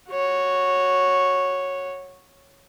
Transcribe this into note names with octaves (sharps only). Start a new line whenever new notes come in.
F#4 C#5